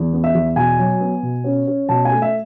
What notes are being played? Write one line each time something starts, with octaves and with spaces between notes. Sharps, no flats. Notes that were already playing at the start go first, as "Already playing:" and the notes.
Already playing: E2
B3
E5
E2
B2 G#5
F#3
B3
B2
C#4
C#4
B2 A5
G#5
A3
E5